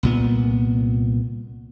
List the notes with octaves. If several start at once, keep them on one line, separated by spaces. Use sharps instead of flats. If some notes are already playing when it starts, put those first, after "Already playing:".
C2 A#2 B3